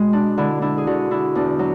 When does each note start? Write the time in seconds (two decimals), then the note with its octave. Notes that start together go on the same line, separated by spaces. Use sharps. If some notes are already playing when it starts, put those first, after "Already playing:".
Already playing: B2 G#3
0.13 D4
0.38 D3 E4
0.62 D4 E4
0.78 G#4
0.87 D3 F#4
1.11 D4 E4
1.35 E2 D4
1.59 F#3